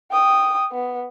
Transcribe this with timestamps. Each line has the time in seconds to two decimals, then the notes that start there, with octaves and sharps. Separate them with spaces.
0.11 G5 D#6
0.72 B3